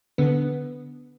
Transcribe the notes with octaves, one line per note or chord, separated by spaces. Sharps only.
D3 B3